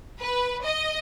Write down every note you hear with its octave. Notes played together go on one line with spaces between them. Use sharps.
B4
D#5